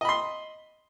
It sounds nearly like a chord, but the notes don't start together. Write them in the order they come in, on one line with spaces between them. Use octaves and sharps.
D#5 B5 C6